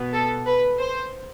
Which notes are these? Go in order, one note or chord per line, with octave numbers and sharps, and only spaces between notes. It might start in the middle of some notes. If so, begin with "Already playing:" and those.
Already playing: B2 B3
A4
B4
C5